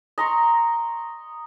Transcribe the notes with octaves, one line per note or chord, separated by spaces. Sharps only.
D#5 A#5 C6 C#6